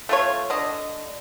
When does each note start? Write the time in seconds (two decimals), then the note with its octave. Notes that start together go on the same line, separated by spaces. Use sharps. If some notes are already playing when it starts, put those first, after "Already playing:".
0.09 A3 F4 C#5
0.50 D3 D#5